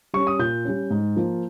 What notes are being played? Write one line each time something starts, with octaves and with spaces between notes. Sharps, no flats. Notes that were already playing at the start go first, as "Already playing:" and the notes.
G3 C#4 C#6
D#6
A#2 G6
G3 C#4
G#2
F3 A#3